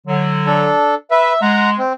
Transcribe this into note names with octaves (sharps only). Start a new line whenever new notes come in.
D3 F#3
D4 A4
B4 E5
G#3 F#5 A#5
C4